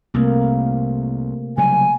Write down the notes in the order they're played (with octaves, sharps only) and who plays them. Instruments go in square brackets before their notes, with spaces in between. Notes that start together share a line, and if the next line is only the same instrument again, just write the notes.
[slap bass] C2 [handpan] C3 A3 A#3
[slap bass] C#3 F#3 G3 [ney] G#5